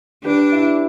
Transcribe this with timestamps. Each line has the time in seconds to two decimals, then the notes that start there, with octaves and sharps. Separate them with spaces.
0.24 D4 G4 B4
0.52 E4